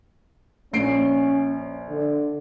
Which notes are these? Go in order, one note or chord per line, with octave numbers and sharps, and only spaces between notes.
A#1 C#4 C7 D7
D3